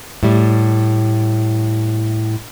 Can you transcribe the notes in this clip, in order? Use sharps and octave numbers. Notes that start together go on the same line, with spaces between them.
A2 G3